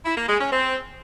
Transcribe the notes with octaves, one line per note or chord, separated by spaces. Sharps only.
E4
A#3
G#3
C#4
C4